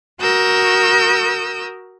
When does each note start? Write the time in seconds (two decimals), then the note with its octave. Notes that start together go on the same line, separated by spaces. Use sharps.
0.20 F#4 A#4 D#6 E6 G6